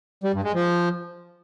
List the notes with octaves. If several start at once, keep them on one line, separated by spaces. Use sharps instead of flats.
G3
G2
G#3
F3